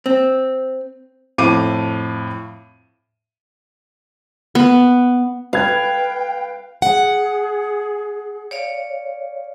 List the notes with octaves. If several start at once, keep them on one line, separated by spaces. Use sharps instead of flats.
C4
F2 A2 F5 D6 D#7
B3
B4 F5 G5 G#6
G#4 F#5
C#5 D5 F5